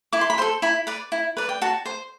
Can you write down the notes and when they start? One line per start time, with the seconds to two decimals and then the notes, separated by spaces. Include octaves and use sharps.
0.12 E4 D6
0.21 C6
0.30 B5
0.38 C5 C6
0.42 A4
0.62 E4 B5
0.87 B4 D5
1.12 E4
1.37 B4 D5
1.49 G5
1.61 F#4 A5
1.86 C5